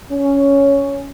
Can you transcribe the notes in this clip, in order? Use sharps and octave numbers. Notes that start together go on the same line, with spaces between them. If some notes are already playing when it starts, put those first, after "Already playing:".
C#4